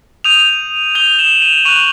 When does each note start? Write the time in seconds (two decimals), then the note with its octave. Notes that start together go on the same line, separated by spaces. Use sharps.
0.24 D#6 G6 D#7 F7
0.95 D#6 G6 F7 G7
1.19 E7 F#7
1.42 D#7 F7
1.65 C#6 F#6 D#7 F7